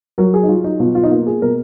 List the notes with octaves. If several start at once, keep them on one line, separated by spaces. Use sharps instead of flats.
F#3 A#4
G#4
D#4
F#3 F4
D#4
B2 F4
F4
D#4
A#3 F4
G#4
B2 A#4